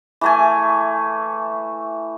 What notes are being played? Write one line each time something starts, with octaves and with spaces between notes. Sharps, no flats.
E3 A3 G#5